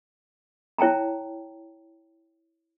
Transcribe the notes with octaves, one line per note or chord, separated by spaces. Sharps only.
E4 C#5 G5 A5 A#5